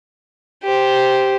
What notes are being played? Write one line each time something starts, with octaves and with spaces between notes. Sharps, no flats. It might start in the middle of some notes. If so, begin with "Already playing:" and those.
G4 C5